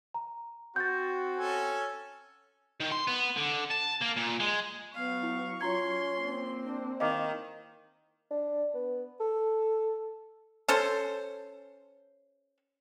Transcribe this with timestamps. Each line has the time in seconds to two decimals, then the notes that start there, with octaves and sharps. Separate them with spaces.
0.14 A#5
0.76 C4 F#4 G6 A6
1.37 C#4 A4 G#5
2.80 D#3
2.92 C6
3.07 B3
3.37 D3
3.70 A5
4.01 A#3
4.16 A#2
4.40 G#3
4.95 F#3 B3 F5 C#6
5.23 E4
5.61 C#4 F4 A#5 C6 G#6
6.20 A#3 C4
6.63 D4
7.00 D#3 E4 D#5 F5 D6
8.31 D4
8.74 B3
9.20 A4
10.68 C#4 A4 C5